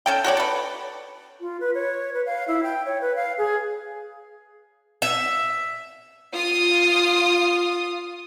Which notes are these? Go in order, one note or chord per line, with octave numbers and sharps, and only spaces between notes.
C#4 A4 G5
F#4 A4 C#5 D5
A4 B4
F4
B4
C#5
B4
F5
E4
G5
C#5
B4
F5
G#4
E5
F4 D#6